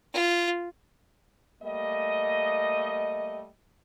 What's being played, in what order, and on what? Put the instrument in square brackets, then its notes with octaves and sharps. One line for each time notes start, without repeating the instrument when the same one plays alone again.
[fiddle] F4
[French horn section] G3 A3 A#3 D#5